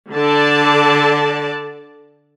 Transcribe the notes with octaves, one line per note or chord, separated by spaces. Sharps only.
D3 D5 A5